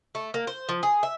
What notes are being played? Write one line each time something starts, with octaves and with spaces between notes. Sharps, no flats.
A3
A#3
C5
F3
G#4
E5